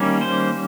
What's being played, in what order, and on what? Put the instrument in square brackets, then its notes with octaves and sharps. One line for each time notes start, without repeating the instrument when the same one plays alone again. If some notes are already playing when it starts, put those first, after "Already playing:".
Already playing: [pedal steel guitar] D#3 G3 A#3 C#4
C5